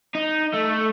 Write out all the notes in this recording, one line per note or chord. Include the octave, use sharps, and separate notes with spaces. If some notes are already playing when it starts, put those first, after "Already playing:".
D#4
A3